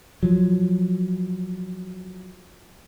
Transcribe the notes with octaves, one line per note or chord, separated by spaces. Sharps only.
F3 F#3